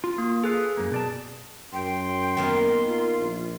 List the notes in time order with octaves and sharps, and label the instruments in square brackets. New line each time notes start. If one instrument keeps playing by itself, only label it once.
[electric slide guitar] F4
[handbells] A#3
[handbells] G#4 [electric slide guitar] A4 B4 F5
[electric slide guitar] F#2 A#3
B2 D5 A5
[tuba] F#2 [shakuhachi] G5 [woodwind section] C6
[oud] D#3 A#3 B3
[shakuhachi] F4
[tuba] A#1